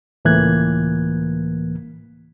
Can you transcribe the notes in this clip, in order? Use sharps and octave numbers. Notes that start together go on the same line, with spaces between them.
C#2 A2 E3 A#3 F#6 G#6